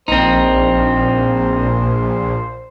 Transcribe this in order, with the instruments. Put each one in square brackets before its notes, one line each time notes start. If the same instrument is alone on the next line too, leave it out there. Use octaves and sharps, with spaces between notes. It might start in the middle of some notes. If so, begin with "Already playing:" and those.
[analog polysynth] A#1 [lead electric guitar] C4 D#4 [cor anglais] C5